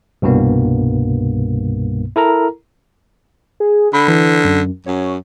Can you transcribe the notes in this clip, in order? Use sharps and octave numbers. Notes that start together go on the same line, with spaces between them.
C2 G2 B2 A#3 B3
E4 A4 A#4 A#5
G#4
D3 B5
E3
F#2
F#2 C#5